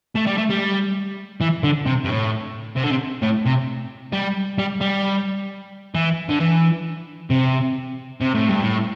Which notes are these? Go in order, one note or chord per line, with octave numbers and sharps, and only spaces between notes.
A3
G3
A3
G3
E3
D3
C3
G2
A2
C3
D3
C3
A2
C3
G3
G3
G3
E3
D3
E3
C3
C3
A2
G2
A2